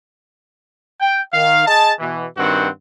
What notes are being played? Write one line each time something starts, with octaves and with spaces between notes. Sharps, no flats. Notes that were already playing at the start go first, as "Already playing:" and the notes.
G5
D#3 F5
G#4 D#5 A5
B2 E3
G2 D#3 C4 F#4 F#5